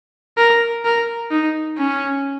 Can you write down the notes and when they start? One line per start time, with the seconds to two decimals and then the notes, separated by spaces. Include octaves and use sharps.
0.38 A#4
0.85 A#4
1.31 D#4
1.78 C#4